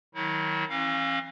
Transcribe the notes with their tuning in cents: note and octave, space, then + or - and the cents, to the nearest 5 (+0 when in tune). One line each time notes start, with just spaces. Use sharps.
D#3 +0 F#3 -5 E4 -35
E3 +5 C#4 -45 F5 +5